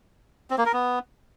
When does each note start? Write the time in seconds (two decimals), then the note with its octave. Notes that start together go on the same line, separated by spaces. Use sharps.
0.50 C4
0.58 A#3
0.65 A#4
0.73 B3